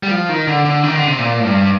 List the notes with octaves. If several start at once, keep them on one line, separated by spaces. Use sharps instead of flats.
G3
F3
D#3
D3
D3
D#3
D3
C3
A#2
A2
G2